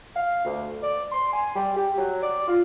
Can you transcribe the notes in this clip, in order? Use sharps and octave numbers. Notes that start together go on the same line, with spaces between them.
F5
D2
D5
C6
G#5
G3
G4
F#3
D5
F4